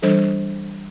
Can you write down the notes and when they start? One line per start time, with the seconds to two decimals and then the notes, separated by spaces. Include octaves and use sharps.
0.02 E3 G3 D4 A4 C5